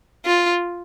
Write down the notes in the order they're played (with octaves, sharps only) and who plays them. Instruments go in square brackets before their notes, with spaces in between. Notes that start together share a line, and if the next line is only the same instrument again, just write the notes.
[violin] F4